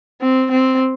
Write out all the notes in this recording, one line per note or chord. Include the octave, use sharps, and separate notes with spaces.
C4
C4